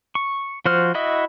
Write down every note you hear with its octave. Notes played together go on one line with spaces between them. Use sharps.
C#6
F3 F#4 C5 F6
E4 F#4 D#5 E5 D#6